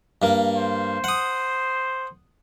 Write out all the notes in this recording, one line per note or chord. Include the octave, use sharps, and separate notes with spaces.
G2 A#3
C5
F#5 D#6